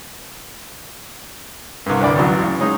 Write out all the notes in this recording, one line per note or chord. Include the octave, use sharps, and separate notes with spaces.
C2 G2
D2 D4 D5 B5
A1 A2 F#3
C#3
G#3 C#4 D#4